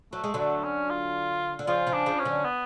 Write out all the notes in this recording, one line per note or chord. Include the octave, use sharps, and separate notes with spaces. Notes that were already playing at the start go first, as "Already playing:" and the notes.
F#3 A3
G#3
D3 F#3 A3
C#4
F4
D3
C#3 F3 F4
C#3 F3
D4
C#3 F3
C#4
D3 F#3
B3